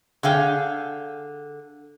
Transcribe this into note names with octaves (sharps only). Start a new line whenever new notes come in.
D3 G#4 F5 G5